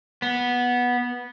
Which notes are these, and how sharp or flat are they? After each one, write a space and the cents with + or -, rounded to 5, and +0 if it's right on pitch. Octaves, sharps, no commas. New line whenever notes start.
B3 -10